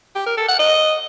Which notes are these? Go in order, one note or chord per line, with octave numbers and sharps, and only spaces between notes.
G4
A#4
A4
F#5
D#5